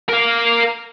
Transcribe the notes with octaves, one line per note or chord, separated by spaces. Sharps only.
A#4 F5